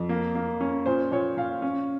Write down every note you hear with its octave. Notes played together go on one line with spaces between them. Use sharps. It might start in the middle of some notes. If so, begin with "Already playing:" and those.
Already playing: F2
A#3
A#3
C#4
A#2 C5
A#2 C#5
A#2 F5
C#4